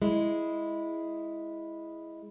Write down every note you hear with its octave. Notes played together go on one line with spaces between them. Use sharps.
G#3 E4